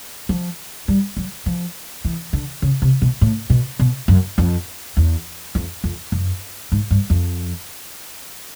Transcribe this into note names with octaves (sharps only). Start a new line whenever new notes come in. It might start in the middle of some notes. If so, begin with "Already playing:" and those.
F3
G3
F#3
F3
E3
D3
C#3
C3
B2
A2
B2
B2
F#2
F2
E2
F2
F2
F#2
G#2
G2
F2